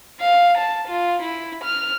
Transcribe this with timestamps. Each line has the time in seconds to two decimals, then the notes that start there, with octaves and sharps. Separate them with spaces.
0.20 F5
0.57 A5
0.88 F4
1.22 E4
1.63 F6